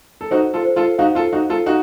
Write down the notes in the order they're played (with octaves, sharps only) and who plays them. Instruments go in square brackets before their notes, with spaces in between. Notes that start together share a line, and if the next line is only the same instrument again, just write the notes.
[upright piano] A4
[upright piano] D#4 F#4 [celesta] C5
[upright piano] F4 A4
[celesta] C5
[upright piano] F4 A4
[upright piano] D#4 F#4 [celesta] F5
[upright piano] F4 A4
[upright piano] D#4 F#4 [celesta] F5
[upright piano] F4 A4
[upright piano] D#4 F#4 [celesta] F5